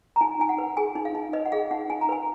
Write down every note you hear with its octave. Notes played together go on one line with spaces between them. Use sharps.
A#5
D#4 G#5
D#4 G#5
F#5
B4
G#4 G#5
D#4
F5
D#4
B4 D#5
F#5
G#4 F5
D#4 F#5
D#4 G#5
A#5
B4 G#5